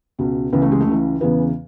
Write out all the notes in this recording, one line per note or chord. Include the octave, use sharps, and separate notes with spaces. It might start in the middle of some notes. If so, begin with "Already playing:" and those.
C#2 B2
C#2 C#3 E3 B3
A3
G#3
A3
C#2 C#3 E3
E2 C#3 E3 B3